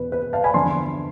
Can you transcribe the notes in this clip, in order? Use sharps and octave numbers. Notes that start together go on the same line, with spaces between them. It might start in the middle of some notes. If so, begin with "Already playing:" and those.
Already playing: E2 B2 B4
B4
F5 A5
G#5 B5
E2 D3 F3 A5 C6